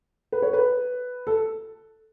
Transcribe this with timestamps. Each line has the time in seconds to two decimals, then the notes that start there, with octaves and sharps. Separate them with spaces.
0.32 B4
0.42 C#5
0.53 B4
1.27 A4